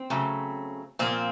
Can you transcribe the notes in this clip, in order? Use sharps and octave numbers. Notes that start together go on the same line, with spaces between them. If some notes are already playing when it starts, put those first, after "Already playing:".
Already playing: C4
C#3 F#3 A3
A#2 F3 A#3 C4